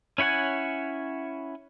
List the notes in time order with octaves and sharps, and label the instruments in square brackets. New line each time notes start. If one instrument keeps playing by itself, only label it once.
[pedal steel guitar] C#4 E4 C#5 F#5 G#5